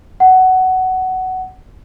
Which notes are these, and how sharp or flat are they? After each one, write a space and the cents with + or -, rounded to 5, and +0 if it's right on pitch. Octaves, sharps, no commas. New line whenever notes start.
F#5 +15